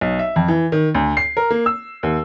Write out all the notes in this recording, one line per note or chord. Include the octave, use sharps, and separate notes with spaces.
B1
E5
F2
E3
D#3
D2
C7
A#4
A#3
E6
D#2